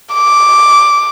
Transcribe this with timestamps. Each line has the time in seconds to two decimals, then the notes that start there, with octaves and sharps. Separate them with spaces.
0.14 D6